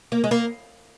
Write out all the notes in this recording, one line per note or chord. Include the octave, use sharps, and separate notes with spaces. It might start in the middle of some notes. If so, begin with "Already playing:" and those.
A#3
G#3
A#3